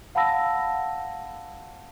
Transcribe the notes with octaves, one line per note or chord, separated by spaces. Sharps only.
F5 F#5 A5 B5 E6 A#6